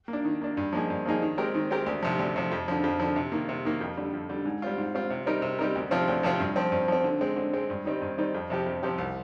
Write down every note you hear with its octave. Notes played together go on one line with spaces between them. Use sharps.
A#3
D4
D#3
A#3 D4
G2
F3 A#3 D#4 G#4
G2
F3 A#3 D#4 G#4
D#3
G#3 C4 G4 A#4
D#3
G#3 C4 G4 A#4
D2
C3 F3
D2
C3 F3
F2
D3 F3
F2
D3 F3
C3
D#3 A#3
C3
D#3 A#3
F2
D3 G3
F2
D3 G3
G#2
G3 C4 F4
G#2
G3 C4 F4
C3
G3 C4 D#4 A#4
C3
G3 C4 D#4 A#4
D2
C3 F3 C4 F4
D2
C3 F3 C4 F4
G2
F3 C4
G2
F3 C4
D3
G#3 C4
D3
G#3 C4
G2
D#3 G3 C4 D#4
G2
D#3 G3 C4 D#4
F2
C3 F3 C4 G4
F2
C3 F3 C4 G4
C2